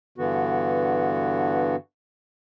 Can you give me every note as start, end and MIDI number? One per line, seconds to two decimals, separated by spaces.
0.18 1.76 43
0.18 1.76 50
0.18 1.76 52
0.18 1.76 59
0.18 1.76 66